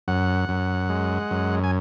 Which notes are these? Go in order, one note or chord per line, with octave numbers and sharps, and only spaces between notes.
F#2 F#5
F#2
G#3
F#2
G#5